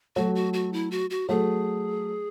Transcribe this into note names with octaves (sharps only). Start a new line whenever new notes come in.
F#3 A3 F#4
F#4
F#4
E4
F#4
F#4
F#3 A3 G#4